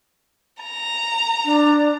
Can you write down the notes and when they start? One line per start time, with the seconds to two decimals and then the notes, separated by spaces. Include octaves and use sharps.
0.63 A#5
1.45 D4